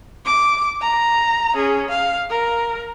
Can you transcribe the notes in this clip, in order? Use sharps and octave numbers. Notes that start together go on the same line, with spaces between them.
D6
A#5
C#4 G#4
F5
A#4